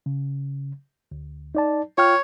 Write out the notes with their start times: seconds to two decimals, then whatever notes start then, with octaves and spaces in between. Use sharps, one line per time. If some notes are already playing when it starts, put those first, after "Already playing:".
0.06 C#3
1.12 D2
1.55 D#4 D5 A5
1.98 F4 C#5 G5 F6